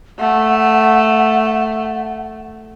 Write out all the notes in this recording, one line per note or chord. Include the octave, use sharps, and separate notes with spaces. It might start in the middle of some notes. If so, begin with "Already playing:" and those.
A3 F#5